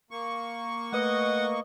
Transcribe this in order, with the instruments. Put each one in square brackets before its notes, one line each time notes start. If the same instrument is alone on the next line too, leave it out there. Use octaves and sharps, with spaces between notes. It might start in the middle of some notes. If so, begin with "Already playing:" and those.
[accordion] A#3 C#6
[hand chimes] A3 B4 [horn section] D#5 [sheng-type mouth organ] F#5